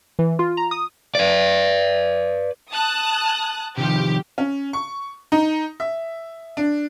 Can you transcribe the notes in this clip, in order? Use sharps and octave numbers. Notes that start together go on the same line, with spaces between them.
E3
F4
A#5
D#6
B4 D5
A5 D#6 F#6
C3 D#3 F3 G4
C#4
C#6
D#4
E5
D4